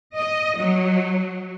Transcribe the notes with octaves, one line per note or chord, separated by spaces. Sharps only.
D#5
F#3